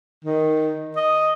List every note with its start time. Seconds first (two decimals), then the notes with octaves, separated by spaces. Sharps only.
0.24 D#3
0.96 D#5